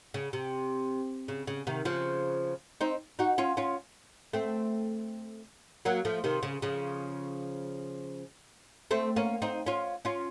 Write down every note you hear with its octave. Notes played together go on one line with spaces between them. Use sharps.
C#3
C3
C#3
C#3
C3 D#3
C#3 F3
C4 D#4
D#4 F#4
C#4 F4
C#4 F4
A3 C4
F#3 A#3
F3 A3
C3 D#3
C#3
C#3 F3
A3 C4
A#3 C#4
C4 D#4
C#4 F4
C#4 F4